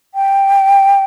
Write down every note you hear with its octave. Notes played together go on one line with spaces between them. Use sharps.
G5